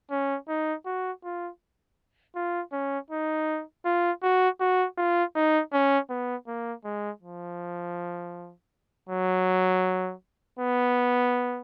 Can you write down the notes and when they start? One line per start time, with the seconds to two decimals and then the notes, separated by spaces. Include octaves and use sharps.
0.11 C#4
0.48 D#4
0.85 F#4
1.24 F4
2.35 F4
2.72 C#4
3.11 D#4
3.85 F4
4.23 F#4
4.60 F#4
4.98 F4
5.35 D#4
5.72 C#4
6.10 B3
6.47 A#3
6.85 G#3
7.22 F3
9.09 F#3
10.59 B3